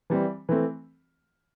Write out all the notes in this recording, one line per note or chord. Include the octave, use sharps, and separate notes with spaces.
E3 G3 C4
E3 A3 C4